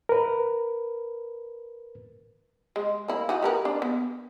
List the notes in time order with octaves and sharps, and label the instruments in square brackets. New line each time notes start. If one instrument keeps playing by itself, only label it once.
[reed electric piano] A#4 B4
[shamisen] G#3
A#3 E4
E3 D#4 F#4
G4 A#4 B4
D4
B3